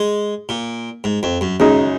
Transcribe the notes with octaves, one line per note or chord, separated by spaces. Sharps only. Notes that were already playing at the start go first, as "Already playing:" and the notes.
Already playing: G#3
A#2
G#2
F2
F#2
F#2 C#3 G#3 D#4